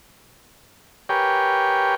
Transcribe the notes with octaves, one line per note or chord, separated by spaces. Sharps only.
G4 A#4 B4 C#5 G5 G#5